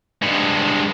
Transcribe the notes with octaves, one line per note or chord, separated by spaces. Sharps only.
G2 G#3